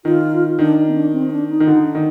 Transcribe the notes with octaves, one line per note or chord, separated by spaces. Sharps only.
D#3 F4
D#3 D4
C4
D4
C4
D#4
D4
D#4
D#3
D3 D#4
D4
D#3